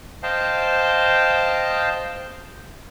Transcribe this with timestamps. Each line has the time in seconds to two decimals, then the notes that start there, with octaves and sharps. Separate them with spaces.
0.23 C5 D#5 F5 G5 A5